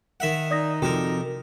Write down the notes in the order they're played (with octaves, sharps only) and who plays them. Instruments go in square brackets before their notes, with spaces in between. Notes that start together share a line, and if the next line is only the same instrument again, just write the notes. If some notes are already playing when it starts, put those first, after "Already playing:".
[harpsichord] D#3 E5 F#5
[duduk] D#4 [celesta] D5 D#6 A#6
[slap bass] C3 F3 [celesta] F#4 G5 [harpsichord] A4 A#4